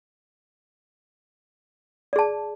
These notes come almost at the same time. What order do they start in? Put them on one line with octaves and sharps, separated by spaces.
D5 G#4 A5